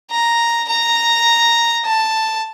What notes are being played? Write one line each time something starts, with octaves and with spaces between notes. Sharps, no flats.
A#5
A#5
A5